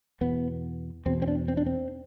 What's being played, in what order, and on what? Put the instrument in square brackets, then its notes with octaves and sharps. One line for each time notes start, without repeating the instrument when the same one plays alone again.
[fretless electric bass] E2 B2 B3
E2 B2 C4
C4
D4
C4
D4
C4